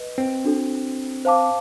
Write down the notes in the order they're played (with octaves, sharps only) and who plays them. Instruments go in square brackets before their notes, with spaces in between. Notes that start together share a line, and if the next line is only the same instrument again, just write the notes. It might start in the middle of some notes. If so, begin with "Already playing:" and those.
Already playing: [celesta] B4 D#5
[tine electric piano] C4
[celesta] D4 F#4 A4
C5 F5 A5 D6